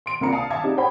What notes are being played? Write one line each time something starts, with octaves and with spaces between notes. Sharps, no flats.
C6 D7
C2 A#3 D4 F4 A#5 C#7
F5 A5 D#6
E5 F5 A5 D6 G#6
D4 D#4 G4
C5 C#5 G5 B5